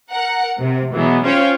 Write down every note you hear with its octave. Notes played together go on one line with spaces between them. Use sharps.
A#4 F#5
C3
B2 E3 F#3 G#3 B3
C#4 F4 C5 C#5 F5 G5